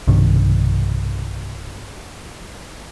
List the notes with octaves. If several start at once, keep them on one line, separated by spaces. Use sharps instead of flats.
B1 G2 C3 D#3